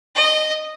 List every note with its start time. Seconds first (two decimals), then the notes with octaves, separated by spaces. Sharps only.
0.15 D#5